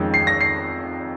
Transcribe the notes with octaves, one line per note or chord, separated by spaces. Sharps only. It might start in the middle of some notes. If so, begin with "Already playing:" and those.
Already playing: F2 D#3 G#3 C#4
C7
A#6
C7